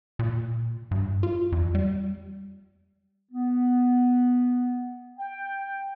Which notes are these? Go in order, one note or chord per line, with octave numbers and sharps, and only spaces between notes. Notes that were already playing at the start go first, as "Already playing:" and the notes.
A#2
G2
F4
F2
G3
B3
G5